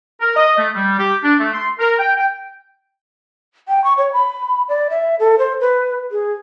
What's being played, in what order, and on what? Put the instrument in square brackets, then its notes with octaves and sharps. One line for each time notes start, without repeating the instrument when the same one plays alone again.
[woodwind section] A#4
D#5
A3
G3
G4
D4
A3
C6
A#4
G5
G5
[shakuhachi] G5
C#6
C#5
B5
D5
E5
A4
C5
B4
G#4